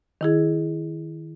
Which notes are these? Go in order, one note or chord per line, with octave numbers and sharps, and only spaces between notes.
D#3 E4 G#4